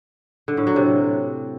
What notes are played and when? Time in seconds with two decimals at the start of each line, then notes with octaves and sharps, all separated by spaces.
0.48 D3
0.57 A2
0.67 F#3
0.76 C3